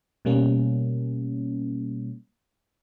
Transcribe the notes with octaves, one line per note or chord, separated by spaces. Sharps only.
B2 G3 A#3 C#4